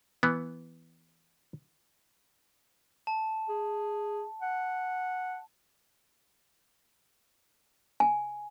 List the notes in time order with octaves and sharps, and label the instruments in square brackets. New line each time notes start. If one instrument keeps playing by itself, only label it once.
[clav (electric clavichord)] E3 B3
[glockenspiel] A5
[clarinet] G#4
F#5
[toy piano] G#5